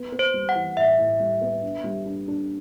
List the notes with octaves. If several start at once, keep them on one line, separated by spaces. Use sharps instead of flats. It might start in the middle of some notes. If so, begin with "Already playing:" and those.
Already playing: B3
B3
C5
G3
F#5
E3
A2 E5
A2
G3
B3
D4
G3
D4
D4